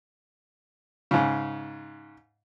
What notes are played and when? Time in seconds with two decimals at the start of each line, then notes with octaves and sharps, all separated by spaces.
1.11 G#2 C#3